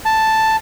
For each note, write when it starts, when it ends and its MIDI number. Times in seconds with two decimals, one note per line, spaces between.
0.05 0.56 81